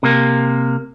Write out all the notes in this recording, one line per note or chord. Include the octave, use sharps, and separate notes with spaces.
C3 A#3